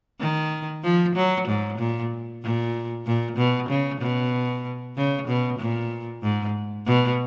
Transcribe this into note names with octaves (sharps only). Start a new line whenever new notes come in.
D#3
F3
F#3
G#2
A#2
A#2
A#2
B2
C#3
B2
C#3
B2
A#2
G#2
B2